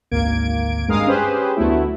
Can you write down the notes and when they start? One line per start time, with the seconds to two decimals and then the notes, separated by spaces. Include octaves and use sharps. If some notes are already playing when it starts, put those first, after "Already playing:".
0.11 G#1 D2 A#3 G#6 D7
0.87 G#1 G2 G#3 A#4 F5 D#6
1.07 C#4 G4 G#4 B4 C5
1.57 D2 F#3 A3 B3 E4